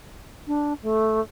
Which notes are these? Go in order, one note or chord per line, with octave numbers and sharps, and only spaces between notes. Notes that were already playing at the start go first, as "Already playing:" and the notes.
D4
A3